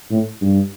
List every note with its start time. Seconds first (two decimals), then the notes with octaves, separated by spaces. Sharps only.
0.11 A2
0.41 G2